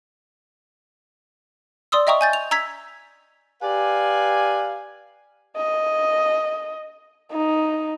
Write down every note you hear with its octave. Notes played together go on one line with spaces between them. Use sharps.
D5 C6 D#6 E6
D#5 E5 G5 A#5 C#6 D#6
G#5 G6 A6
F7
A#5 E6 G#6 B6
G4 B4 D5 F5 G#5
D#5
D#4